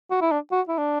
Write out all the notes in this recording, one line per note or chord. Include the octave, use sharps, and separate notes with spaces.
F#4
E4
D4
F#4
E4
D4